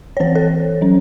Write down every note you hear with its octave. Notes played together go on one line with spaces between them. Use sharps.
C#5
E3 C4 C5
A4 C#5
F#3 C#4